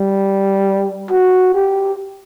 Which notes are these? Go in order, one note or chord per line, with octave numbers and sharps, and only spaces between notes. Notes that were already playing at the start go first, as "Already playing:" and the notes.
Already playing: G3
F#4
G4